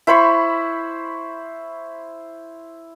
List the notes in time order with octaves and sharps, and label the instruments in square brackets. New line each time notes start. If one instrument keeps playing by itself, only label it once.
[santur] E4 C5 B5 C#6